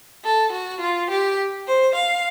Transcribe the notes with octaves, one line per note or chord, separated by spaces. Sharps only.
A4
F#4
F4
G4
C5
F5